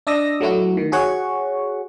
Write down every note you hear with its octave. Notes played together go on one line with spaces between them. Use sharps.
D4 D5 D#5 D#6 E6 A#6
F#3 A3 E4 F#4
D#3
F#4 G#4 C#5 F#5 C#6